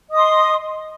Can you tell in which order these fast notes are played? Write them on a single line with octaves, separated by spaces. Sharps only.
D#5 D#6 C6